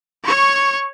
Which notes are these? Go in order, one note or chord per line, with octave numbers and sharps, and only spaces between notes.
C#5 C#6